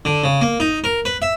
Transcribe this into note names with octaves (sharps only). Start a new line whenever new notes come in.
D3
C#3
A#3
D#4
A#4
B4
E5